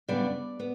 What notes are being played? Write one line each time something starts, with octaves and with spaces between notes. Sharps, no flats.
F#2 C#3 G3 B3 D4 D5
B3